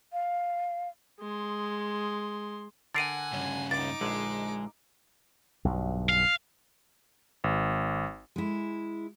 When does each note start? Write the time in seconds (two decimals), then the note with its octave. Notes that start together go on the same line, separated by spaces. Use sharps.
0.13 F5
1.20 G#3 C6
2.94 D3 A#4 F#5 G#5 A6 C7 D#7
3.32 G2 C#3 C#4
3.71 C#2 D#4 D6 A6
4.01 A#1 D3 G#3
5.65 B1 G2
6.09 F5
7.44 G#1
8.36 G#3 E4